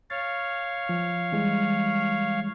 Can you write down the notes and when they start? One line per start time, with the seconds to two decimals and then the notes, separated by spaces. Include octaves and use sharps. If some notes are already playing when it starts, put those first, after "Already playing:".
0.10 C#5 F5 A6
0.89 F3
1.32 E3 G3 G#3